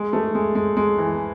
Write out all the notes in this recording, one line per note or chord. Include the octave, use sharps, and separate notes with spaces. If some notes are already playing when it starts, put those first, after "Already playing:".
Already playing: G#3
A3
G#3
G#3
G#3
E3